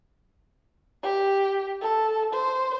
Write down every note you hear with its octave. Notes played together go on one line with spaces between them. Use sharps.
G4
A4
C5